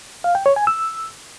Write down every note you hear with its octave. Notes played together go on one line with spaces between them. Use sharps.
F5
G5
C#5
G#5
E6